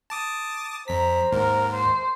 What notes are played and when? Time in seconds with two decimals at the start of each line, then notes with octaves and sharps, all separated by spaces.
0.10 A5 D6 D#6
0.88 F2 C5 A#5 B6
1.32 D#2 G#2 A#4
1.73 C5